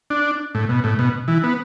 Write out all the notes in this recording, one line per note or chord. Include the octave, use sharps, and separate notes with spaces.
D4
A2
B2
A2
B2
E3
B3